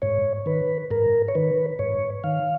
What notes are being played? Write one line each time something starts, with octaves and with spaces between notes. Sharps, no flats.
G#2 C#5
D#3 B4
G#2 A#4
C#5
D#3 B4
G#2 C#5
D#3 F5